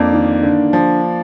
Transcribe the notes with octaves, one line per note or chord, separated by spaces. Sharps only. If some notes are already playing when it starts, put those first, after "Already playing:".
Already playing: F2 A#3 D4
D#3
D3
F3